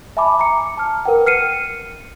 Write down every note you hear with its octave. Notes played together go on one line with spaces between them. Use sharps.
E5 G#5 A5 B5 D6
A#5 D6 C#7
A5 F6
A#4 B4 F#5 G5
F6 C7 C#7 D#7